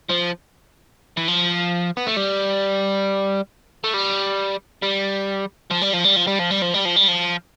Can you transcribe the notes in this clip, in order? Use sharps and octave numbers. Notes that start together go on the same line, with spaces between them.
F3
E3
F3
B3
A3
G3
A3
G3
G3
F3
G3
F3
G3
F3
G3
F3
G3
F3
G3
F3
G3
F3